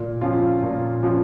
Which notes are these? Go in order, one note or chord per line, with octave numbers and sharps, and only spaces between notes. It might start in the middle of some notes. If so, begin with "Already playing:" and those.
Already playing: A#2
F3 C#4 F4
A#2
F3 C#4 F4